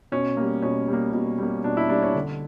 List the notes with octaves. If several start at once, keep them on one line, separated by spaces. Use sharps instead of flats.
B2 C#4
G3 A#3
B2 C#4
G3 A#3
B2
G3 A#3
B2 D4
E4
G3 A#3 D4
C#4
D3